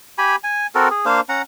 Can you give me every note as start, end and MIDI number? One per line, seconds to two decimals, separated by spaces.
0.18 0.36 67
0.18 0.36 80
0.18 0.36 83
0.44 0.67 80
0.75 0.88 60
0.75 0.88 66
0.75 0.88 69
0.75 0.88 70
0.90 1.05 68
1.05 1.20 58
1.05 1.20 62
1.05 1.20 72
1.05 1.20 77
1.29 1.42 61
1.29 1.42 78
1.29 1.42 82